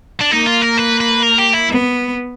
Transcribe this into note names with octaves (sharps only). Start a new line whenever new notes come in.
D4
A#3 D#4
F4
A#4
B4
B4
A#4
G4
E4
B3